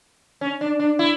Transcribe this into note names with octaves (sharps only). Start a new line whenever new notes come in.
C#4
D4
D4
E4